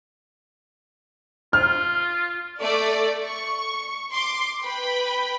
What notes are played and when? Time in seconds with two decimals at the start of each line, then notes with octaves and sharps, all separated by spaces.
1.53 F4 F6
2.61 A3 D5
3.24 C#6
4.13 C6 D6
4.64 B4 G5 B5